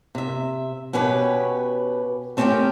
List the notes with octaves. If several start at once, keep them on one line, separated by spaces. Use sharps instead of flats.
C3 E5
B2 C#4 G4 B4 C#5
A3 C4 C#4 G4 A#4 G5